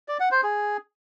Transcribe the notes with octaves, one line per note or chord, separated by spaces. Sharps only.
D5
F#5
C5
G#4